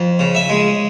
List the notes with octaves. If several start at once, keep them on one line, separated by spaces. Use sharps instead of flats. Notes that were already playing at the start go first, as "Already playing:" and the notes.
Already playing: F2
C#3
E5
G#3